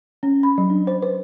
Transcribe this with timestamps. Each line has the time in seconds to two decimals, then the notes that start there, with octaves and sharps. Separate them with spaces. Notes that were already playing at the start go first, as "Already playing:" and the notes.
0.23 C#4
0.43 B5
0.58 F#3
0.70 D4
0.87 C5
1.02 B4